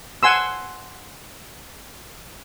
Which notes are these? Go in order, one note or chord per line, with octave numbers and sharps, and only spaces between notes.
F#5 G#5 C6 E6